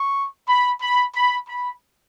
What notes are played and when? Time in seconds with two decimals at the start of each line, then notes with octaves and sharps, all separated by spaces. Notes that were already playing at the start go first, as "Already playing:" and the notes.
Already playing: C#6
0.48 B5
0.82 B5
1.15 B5
1.48 B5